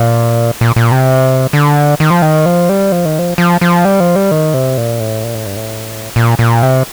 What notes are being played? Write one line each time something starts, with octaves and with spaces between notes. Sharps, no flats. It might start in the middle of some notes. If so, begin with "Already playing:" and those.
Already playing: A#2
A#2
A#2
C3
D3
D#3
F3
D#3
F3
G3
F3
D#3
F3
F3
F3
G3
F3
G3
D#3
C3
A#2
A2
A#2
A2
G2
A2
A#2
A#2
C3